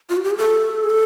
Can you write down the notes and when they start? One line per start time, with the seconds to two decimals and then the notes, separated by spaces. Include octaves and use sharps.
0.10 F4
0.17 F#4
0.24 G4
0.31 G#4
0.38 A4
0.84 G#4
0.90 A4